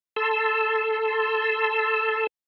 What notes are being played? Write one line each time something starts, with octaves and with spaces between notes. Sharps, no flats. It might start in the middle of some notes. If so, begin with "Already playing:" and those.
A4 A5 C6 E6